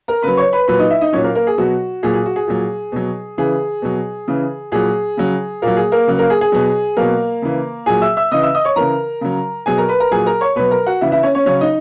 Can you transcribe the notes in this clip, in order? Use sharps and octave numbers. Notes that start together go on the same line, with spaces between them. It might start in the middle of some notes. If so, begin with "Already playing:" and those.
A#4 A#5
C#3 F#3 B4 B5
C#5 C#6
B4 B5
A#2 F#3 B4 B5
D#4 D#5
E4 E5
D#4 D#5
A#2 F#3 C#4 C#5
A#3 A#4
A#3 A#4
G#4
B2 F#3 F#4
A#2 F#3 G#4
G#4
F#4
G#4
A#2 F#3
B2 F#3
C#3 E3 G#4
B2 F#3
C#3 E3
A#2 F#3 G#4
C#3 F#3
A#2 F#3 A#3 A#4
G#4
A#3 A#4
C#3 F#3
A#3 A#4
G#4
G#4
B2 F#3
B2 F#3 A#3 A#4
C#3 E3
A#2 F#3 G#4 G#5
E5 E6
E5 E6
C#3 E3 D#5 D#6
E5 E6
D#5 D#6
C#5 C#6
C#3 E3 A#4 A#5
C#3 F#3
B2 F#3 G#4 G#5
A#4 A#5
B4 B5
A#4 A#5
A#2 F#3 G#4 G#5
A#4 A#5
C#5 C#6
B2 F#3 B4 B5
A#4 A#5
F#4 F#5
C#3 E3 E4 E5
E4 E5
C#4 C#5
C#4 C#5
C#3 F#3 C#4 C#5
D#4 D#5